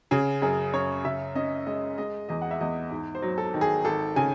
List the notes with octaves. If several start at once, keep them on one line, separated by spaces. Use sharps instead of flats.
C#3 G#4
F#2 G#4
F#2 C#5
C#3 E5
C#4 D#5
G#3 D#5
G#3 D#5
E2 D#5
F#5
E5
E2 D#5
G#2
C5
F#3
A4
D#3
G#4
G#1 A4
C#3 G#5